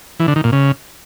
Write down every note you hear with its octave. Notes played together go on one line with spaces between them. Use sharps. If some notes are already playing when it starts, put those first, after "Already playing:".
E3
D3
D#3
A#2
C#3